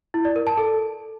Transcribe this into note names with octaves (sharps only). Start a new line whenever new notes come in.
E4
D5
A#4
A5
A4